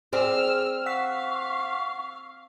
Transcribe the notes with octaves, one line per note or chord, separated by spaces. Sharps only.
C4 G#4 C5 D5 E6 F6
F5 F#5 C#6 E6 B6